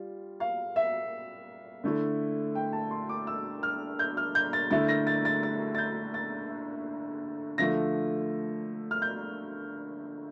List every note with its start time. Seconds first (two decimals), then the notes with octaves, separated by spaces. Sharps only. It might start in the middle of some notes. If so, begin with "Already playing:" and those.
Already playing: G3 F4
0.40 F5
0.76 E5
1.84 D3 A3 E4
2.55 G5
2.73 A5
2.91 C6
3.09 D6
3.27 E6
3.63 F6
3.99 G6
4.17 F6
4.35 G6
4.53 A6
4.71 D3 A3 E4 A6
4.88 A#6
5.07 A6
5.25 A6
5.43 A6
5.75 A6
5.78 G6
6.14 A6
7.58 D3 F3 A3 A#6
8.91 F6
9.02 G6